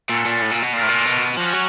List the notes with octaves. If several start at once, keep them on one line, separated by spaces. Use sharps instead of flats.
A#2 C#4 F#4 A4
A#2
A2
A#2
B2
A#2 A3 D4 F4 A#4
A2
A#2
B2
F3 C#4 F#4
F#3